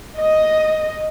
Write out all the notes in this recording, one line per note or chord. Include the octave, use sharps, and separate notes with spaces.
D#5